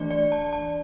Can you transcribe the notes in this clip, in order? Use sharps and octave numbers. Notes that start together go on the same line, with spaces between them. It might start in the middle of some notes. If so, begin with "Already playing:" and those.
Already playing: E3 A3 D4 D5
D5
A5
A5